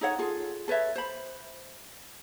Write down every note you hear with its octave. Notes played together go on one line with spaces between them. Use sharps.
D#4 A4 C#5 F#5
F4 G#4 A4
A4 B4 C#5 E5
C5 B5